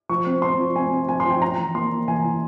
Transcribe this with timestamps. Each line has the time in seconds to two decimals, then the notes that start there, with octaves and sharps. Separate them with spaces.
0.09 F3 C#6
0.26 C4
0.42 C4 C6
0.59 F3
0.76 C4 G#5
0.93 C4
1.08 F3 G#5
1.20 C6
1.25 F3
1.30 G5
1.42 C#4 A#5
1.58 E3
1.75 A#3 C6
1.91 A#3
2.08 E3 G#5
2.24 E3